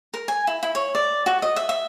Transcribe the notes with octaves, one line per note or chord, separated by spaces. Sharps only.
A#4
G#5
E4
E4
C#5
D5
F#4
D#5
E5
E5